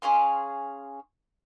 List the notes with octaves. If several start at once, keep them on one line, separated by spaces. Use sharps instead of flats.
C#4 G#4 F5 C6